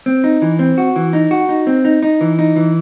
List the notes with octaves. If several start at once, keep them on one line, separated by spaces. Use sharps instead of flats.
C4
D#4
E3
C4
F#4
E3
D#4
F#4
D#4
C4
D#4
D#4
E3
D#4
E3